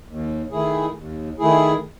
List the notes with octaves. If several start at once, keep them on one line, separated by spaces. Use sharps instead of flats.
D#2
D#3 A3 E4 G#4
D#2
D#3 A3 E4 G#4